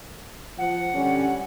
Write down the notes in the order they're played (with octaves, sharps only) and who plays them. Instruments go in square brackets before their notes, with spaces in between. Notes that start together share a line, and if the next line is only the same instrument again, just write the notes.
[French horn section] F3 [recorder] F#5
[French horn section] D3 G3 C#4